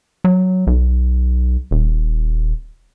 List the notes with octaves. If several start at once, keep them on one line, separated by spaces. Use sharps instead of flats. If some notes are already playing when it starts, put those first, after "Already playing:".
F#3
B1
D#1